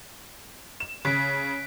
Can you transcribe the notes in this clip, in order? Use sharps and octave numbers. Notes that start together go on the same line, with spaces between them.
E7
C#3 F#6 B6 D7